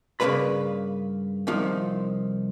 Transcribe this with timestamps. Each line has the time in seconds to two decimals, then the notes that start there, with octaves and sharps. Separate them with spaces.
0.20 G2 C#3 F3 A#3 B4 B5
1.47 C2 C3 D#3 F3